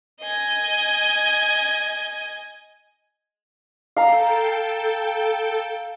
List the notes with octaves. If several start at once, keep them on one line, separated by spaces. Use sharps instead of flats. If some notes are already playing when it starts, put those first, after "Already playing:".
D#5 G#5
A4 F5 G5 A#5